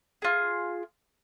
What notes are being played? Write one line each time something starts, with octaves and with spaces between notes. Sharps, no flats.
F4 G#4